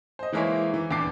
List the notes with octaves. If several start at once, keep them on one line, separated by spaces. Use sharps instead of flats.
C5 D#5
E3 G#3 A#3 E4 C5 C#5
E3
D#1 E2 D4 A5 D6 C7